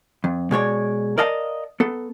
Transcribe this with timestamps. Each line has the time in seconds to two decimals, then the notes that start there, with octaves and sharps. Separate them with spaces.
0.24 F2
0.51 B2 G#3 C#5 D5
1.18 A#4 D5 D#5 F5 A5
1.80 B3 A4